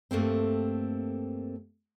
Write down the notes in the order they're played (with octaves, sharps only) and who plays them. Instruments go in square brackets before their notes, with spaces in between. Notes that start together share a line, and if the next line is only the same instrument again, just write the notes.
[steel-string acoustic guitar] G2 A3 A#3 C4